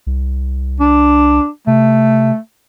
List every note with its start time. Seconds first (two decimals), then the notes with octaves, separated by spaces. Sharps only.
0.07 C2
0.80 D4
1.67 C3 A3